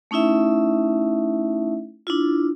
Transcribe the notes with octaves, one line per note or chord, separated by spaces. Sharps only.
A3 C#4 D#4 E4 E5
D4 E4 F4